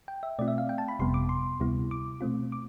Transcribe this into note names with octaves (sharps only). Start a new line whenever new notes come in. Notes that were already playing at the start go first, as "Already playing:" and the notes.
G5
E5
B2 A3 C4 F4 D5
E5
F5
G5
A5
B5
G1 F2 C3 G3 B3 C6
D6
C6
D2 C3 G3 B3 E4
D6
B2 A3 C4 F4
D6